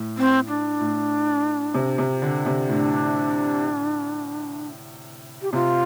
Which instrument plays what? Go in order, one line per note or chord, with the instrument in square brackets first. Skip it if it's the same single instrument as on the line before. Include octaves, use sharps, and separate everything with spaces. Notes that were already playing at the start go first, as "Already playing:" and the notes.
Already playing: [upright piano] A2
[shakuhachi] C4
D4
[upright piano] A2
C3
C3
D3
C3
[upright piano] A2 [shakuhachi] D4
[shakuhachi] G4
[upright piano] C3 [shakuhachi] F4